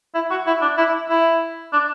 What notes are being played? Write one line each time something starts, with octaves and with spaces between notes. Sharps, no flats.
E4
F#4
E4
D4
E4
E4
D4